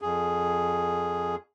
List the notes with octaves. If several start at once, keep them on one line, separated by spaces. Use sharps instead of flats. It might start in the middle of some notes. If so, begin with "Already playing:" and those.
F2 G#4